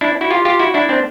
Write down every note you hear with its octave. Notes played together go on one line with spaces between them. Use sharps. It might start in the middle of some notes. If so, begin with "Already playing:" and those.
D4 E4
E4 F#4
F4 G4
F4 G4
E4 F#4
D4 E4
C4 D4